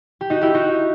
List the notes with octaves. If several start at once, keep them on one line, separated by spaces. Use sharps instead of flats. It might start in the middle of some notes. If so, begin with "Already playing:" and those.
G4
D#4 F#4
E4 G4
D#4 F#4